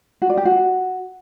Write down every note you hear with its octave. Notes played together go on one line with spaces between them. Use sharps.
F#4
D5
G4
F#4